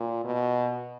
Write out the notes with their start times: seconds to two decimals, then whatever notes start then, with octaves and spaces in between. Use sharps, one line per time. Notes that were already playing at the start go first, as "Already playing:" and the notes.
Already playing: A#2
0.24 B2